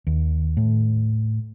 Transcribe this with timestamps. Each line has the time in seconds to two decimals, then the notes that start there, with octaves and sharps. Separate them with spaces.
0.07 D#2
0.57 A2